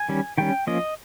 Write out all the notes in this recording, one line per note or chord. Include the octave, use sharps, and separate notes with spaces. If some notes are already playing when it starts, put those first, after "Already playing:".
Already playing: G#5
D#3 G3 C#4
D#3 G3 C#4 G5
F3 A#3 C#4 D#5